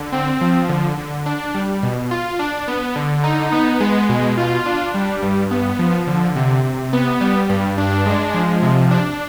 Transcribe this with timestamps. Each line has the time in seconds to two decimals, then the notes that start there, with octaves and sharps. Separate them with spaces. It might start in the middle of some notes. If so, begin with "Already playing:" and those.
Already playing: D3
0.12 C4
0.41 F3
0.69 D3
0.98 D3
1.26 D4
1.54 G3
1.83 B2
2.11 F4
2.39 D4
2.68 B3
2.96 D3
3.24 D#4
3.52 B3
3.80 G#3
4.09 B2
4.37 F4
4.66 D4
4.94 G3
5.22 G2
5.51 B3
5.79 F3
6.07 D3
6.36 C3
6.64 C3
6.93 B3
7.21 G3
7.49 G2
7.78 D4
8.06 G#3
8.34 F3
8.62 C3
8.91 D4